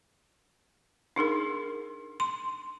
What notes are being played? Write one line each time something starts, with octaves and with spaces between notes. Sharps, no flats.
D4 D#4 G#4 A#4
C6